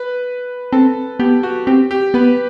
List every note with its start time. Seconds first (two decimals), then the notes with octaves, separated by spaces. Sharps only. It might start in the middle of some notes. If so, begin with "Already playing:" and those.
Already playing: B4
0.72 C4 A4
1.20 B3 G4
1.43 F#4
1.67 C4 G4
1.91 G4
2.14 B3 B4